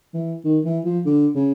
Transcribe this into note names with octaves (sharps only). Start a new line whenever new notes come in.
E3
D#3
E3
F3
D3
C#3